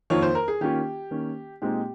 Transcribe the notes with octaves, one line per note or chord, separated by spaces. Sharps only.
F2 D#3 A#3 F4 C#5
C5
A#4
G#4
D#3 A#3 C#4 F4 G4
D#3 A#3 C#4
A#2 G#3 C4 D#4 G4